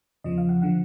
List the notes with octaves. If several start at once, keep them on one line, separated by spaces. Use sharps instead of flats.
E2 C#3 F3 D#5
F5
F#5
D3 F3 F#5